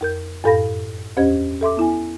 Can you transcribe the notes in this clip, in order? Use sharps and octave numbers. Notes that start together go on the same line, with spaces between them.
F2 A#4 G6
F#2 A2 A4 F5 B5 A#6
E2 C#4 G4 C5 D#5 G#6
A4 E5 C6 D6
B3 E4 G#5